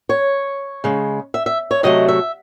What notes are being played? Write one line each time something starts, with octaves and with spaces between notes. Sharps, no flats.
C#5
C#3 G#3
E5
E5
C#5
C3 F#3 A3 D#5
E5